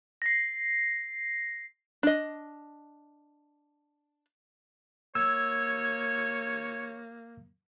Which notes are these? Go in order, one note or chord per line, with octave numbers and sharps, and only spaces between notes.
A#6 C7
D4 D#5
A#3 C#5 E6 G#6